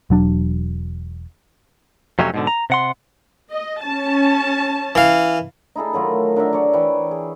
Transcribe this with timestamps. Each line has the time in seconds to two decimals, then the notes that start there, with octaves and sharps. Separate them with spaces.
0.10 E1 F#3 D4
2.19 F2 C3 F#3 A3 C#4
2.34 G#2 B2 D3
2.47 A#5
2.70 C3 F#5 C6
3.50 D#5
3.84 C#4 A5
4.95 E3 F5
5.75 D#4 E4 G#4 A4
5.93 D#3 F#3 A3 F4
6.36 D3 A#4 D5 E5
6.53 G#4 C#5 D5
6.73 E3 G5
7.11 G#4